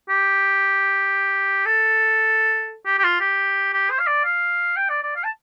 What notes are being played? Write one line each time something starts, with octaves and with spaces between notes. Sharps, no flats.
G4
A4
G4
G4
F4
G4
G4
C5
F5
D5
F5
G5
D5
D5
F5
A5